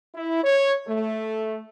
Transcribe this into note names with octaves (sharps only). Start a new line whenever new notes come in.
E4
C#5
A3